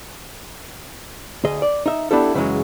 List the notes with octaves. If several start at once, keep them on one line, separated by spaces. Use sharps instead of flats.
D2 G#4 D#5
D5
D#4 E5
B3 D4 E4 G4 A4
F#2 C#3 E3 F#3 G#3